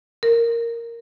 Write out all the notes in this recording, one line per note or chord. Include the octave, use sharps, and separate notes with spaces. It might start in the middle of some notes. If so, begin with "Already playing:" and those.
A#4